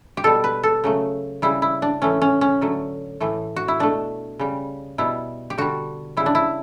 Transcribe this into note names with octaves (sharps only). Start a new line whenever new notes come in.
G4
B2 G3 A4
B4
A4
C#3 F#3 A3
C#3 G3 E4
E4
D4
A2 E3 A3 C#4
C#4
C#4
D3 F#3 A3
A2 E3 A3
F#4
E4
B2 A3 D4
C#3 G3
B2 G3 E4
G4
D3 G3 F#4
C#3 G3 E4
D4
E4